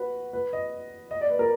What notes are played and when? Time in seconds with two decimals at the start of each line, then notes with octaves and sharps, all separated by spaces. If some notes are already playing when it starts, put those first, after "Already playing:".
Already playing: F#4 B4
0.33 B4
0.53 D#5
1.11 D#5
1.21 D5
1.30 B4
1.39 A#4